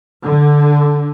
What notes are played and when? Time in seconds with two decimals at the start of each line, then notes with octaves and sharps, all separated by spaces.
0.22 D3